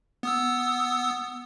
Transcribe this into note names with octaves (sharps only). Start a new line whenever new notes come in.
B3 D#6 E6